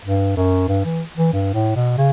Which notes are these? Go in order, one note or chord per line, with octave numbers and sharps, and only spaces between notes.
G2
F#2
G2
E3
E3
G2
A2
B2
C#3